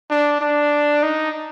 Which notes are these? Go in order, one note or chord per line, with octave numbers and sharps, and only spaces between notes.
D4
D4
D#4